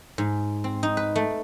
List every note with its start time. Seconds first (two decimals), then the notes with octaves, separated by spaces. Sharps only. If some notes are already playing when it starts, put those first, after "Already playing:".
0.18 G#2
0.64 C4
0.83 D#4
0.97 B4
1.16 A3